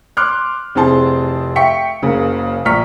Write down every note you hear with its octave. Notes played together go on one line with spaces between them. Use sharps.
C6 D6 F6 F#6
F1 C4 E4 G#4 A5 C6
E5 F5 G5 C#6 B6 C#7
F#1 C#3 A#3
A#1 A#5 C#6 F6 B6